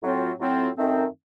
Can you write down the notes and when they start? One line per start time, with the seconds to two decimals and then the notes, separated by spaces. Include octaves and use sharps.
0.02 A2 F#3 C4 F4
0.39 A2 F#3 C4 F4
0.76 F#2 D#3 A3 C4